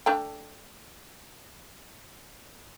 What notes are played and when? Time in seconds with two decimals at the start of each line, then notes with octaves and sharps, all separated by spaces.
0.06 A3 D4 G5